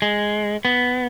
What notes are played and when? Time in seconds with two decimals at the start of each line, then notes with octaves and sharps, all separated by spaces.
0.02 G#3
0.65 B3